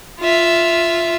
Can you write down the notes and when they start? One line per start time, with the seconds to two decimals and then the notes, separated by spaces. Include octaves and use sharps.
0.20 F4 E5